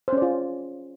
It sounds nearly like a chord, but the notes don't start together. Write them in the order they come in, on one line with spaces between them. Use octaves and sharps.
C5 C#4 D5 F4